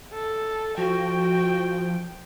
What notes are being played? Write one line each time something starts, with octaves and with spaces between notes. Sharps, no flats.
A4
F3 F#4 G5